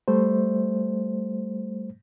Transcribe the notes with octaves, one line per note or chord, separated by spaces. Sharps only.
G3 A3 C5